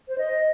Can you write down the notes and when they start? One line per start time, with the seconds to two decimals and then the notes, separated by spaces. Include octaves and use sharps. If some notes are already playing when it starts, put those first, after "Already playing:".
0.08 C5
0.18 D#5